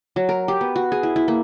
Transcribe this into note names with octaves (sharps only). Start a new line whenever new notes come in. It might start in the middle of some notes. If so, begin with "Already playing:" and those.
F#3
A#4
G4
B3
F#4
G#4
E4
E4
A#3